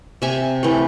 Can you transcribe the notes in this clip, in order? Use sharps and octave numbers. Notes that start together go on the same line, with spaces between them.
C3 E5 G#5
E3 A3